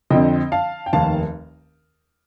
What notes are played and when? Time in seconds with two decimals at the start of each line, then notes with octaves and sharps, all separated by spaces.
0.10 F2 D3 F3 C4 D#5 G5
0.52 F5 A5
0.86 G5
0.93 F1 D#2 D#3 F5 A5